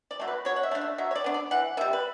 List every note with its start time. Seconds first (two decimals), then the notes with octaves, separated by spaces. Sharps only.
0.11 D5
0.20 F#3 A3
0.28 B4
0.45 F#3 C#5
0.56 F#5
0.63 E5
0.71 A3 D4
0.81 E5
0.98 F#3 E5
1.11 C#5
1.16 D5
1.24 B3 D4
1.34 D5
1.51 E3 F#5
1.77 B3 E5
1.81 G3
1.93 B4